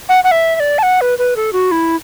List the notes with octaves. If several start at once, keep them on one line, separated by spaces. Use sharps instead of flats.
F#5
F#5
E5
E5
D5
A5
F#5
B4
B4
A4
F#4
E4